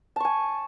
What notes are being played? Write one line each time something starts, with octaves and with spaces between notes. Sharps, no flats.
G#5 A5 C#6